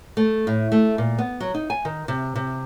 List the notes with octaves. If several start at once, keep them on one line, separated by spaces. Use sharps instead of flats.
A3
A2
A3
A#2
B3
F#3
D#4
G#5
D#3
C3
C3